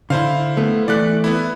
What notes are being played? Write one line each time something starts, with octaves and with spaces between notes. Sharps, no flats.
D3 E4 C5 F5
A3 B3
E3 A3 D5 F#6
B3 E4